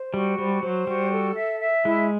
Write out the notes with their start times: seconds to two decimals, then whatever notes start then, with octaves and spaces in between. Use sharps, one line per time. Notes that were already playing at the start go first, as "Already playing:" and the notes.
Already playing: C5
0.14 G3 F#4
0.38 G3 C5
0.63 F#3 C5
0.87 G3 F#4
1.12 A4
1.36 E5
1.60 E5
1.85 G#3 E4